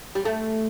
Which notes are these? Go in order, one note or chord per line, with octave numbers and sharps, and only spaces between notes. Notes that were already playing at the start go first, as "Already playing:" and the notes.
G3
A3